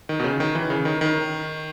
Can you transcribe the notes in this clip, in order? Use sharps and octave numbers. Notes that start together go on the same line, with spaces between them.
D#3
B2
C#3
D#3
E3
C#3
D#3
D#3